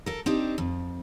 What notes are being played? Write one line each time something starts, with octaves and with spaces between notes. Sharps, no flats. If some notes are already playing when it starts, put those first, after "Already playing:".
A4 A#4
C4 D4 D#4 G4
F2